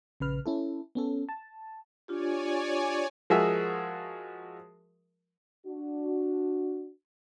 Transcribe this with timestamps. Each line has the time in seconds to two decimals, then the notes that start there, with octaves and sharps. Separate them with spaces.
0.20 A#1 C#3 B4 F6
0.46 C#4 E4 A4
0.95 B3 C#4 A4
1.29 A5
2.08 D4 F4 G4 C#5 D5 G#5
3.30 F3 G#3 F#4 G#4 A#4 E5
5.66 D4 F#4